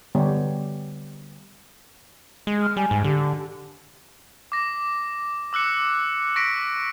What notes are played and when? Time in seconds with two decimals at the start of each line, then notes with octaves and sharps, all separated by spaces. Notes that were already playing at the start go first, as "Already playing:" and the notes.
0.15 D3 G3 B3 G4 C#5
2.47 G#3
2.62 F6
2.77 G3 G#5
2.91 G#2
3.04 D3 G4
4.52 D6 A#6
5.53 D6 E6 F#6 C#7
6.36 C#6 A#6 B6 D7